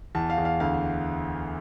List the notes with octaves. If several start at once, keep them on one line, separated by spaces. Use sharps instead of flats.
E2 A5
F5
E2
F5
D2 F5